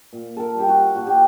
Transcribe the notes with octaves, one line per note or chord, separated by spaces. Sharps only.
A#2
A4 A#4
G3 G4
F#4
A#2 F#4
G4